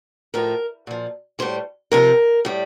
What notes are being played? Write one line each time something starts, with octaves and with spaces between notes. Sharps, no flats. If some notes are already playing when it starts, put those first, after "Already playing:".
A2 F3 A#4
A#2 F3
A2 G3 C5
C3 F3 A#4
A2 G3